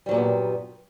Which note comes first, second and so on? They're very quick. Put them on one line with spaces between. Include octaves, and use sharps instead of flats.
G3 F#3 A#2 G2 B3